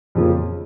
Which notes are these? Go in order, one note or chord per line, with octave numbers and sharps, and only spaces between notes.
F2 C#3 F3 A#3